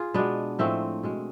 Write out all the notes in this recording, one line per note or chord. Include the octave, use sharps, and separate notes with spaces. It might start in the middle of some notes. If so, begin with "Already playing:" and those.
Already playing: F4 G#4
B2 G#3 B3 D4
A2 F3 G#3 A3 C4
B2 G#3